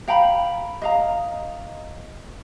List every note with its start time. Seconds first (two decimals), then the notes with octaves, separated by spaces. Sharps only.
0.08 F5 G5 A#5 B5
0.82 D#5 F5 A#5